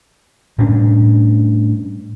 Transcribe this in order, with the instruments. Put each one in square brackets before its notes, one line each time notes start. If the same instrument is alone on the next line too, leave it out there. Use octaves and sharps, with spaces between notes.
[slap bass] A2 G3 C#4 D4